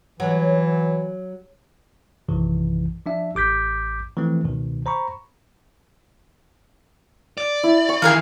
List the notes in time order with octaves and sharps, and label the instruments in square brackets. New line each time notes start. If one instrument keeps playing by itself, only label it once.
[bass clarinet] E3 [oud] F#3
[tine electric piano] A#1 F#2 C3 D#3 E3
F3 D4 E5
A1 D6 G6 B6
E3 F3 A3 C4
C#2 B2 D#3
C5 A#5 B5 C#6
[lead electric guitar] D5
[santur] E4
C#6
[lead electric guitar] D#3 E3 [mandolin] G#4 A#4 F5